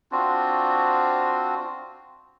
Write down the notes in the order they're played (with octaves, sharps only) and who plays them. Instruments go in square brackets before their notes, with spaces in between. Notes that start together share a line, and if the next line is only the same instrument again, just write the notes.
[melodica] C4 D4 F4 F#4